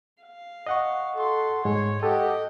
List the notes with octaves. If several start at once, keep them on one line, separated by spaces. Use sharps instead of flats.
F5
D#5 F#5 C#6
F#4 A4 C6
G#2 G#3 C#5
F#4 G4 A4 D#5